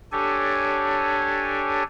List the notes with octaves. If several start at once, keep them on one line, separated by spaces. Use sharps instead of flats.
D4 G4 A4 C#5 G#5